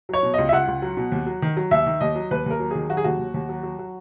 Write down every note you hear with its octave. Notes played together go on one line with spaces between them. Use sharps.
F#3 C#5
B2
C#2 D#5
E5
C#2 F#5
C#2
F#3
B2
D#2
F#3
D#3
F#3
D#2 E5
D#3
D#2 D#5
F#3
D#2 B4
D#2 A#4
F#3
D#3 G#4
F#3 F#4
G#4
D#2 F#4
D#2
D#2
F#3
F#3
F#3